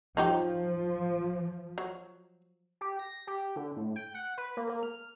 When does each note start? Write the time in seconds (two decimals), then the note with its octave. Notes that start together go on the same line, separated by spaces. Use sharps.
0.17 F3 F#3 D#4 G4
1.78 F#3
2.81 G4
2.99 A#6
3.27 G4
3.56 D3
3.76 A2
3.96 G5
4.14 F#5
4.38 B4
4.57 A#3
4.69 A#3
4.83 F6